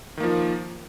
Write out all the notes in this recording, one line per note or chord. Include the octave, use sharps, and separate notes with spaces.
D#3 F3 A#3